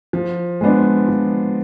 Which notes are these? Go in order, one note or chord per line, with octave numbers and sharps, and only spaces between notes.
F3
G#3 B3 D4
F3